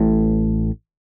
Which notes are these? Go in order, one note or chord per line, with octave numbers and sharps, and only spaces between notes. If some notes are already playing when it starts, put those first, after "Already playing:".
Already playing: A1 A2